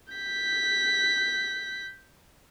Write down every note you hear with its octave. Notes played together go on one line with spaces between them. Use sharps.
G6 B6